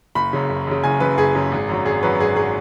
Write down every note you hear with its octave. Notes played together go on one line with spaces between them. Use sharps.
F#1 B5
F#2 C#3
F#1
F#2 C#3
F#1 G#5
F#2 C#3 B4
F#1 G#4
F#2 C#3
G#1
F#2 F#3
G#1 G#4
F#2 F#3 B4
G#1 G#4
F#3 G#4